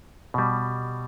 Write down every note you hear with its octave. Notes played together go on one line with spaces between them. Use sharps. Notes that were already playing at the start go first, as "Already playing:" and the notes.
B2 G3